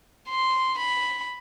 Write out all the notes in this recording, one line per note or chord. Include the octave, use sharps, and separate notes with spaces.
C6
B5